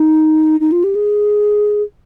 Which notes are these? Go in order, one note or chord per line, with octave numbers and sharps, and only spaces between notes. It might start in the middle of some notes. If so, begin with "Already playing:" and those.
Already playing: D#4
D#4
F4
G4
G#4